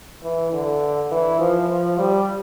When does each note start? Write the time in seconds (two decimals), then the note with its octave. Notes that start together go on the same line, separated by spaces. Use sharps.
0.23 E3
0.53 D3
1.11 E3
1.39 F3
1.69 F3
1.99 G3